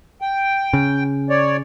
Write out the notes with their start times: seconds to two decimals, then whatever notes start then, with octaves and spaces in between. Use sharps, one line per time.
0.21 G5
0.73 C#3
1.30 C#5 D5